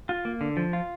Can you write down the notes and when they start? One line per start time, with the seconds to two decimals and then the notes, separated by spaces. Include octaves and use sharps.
0.09 F4
0.25 A#3
0.41 D3
0.57 F3
0.73 F4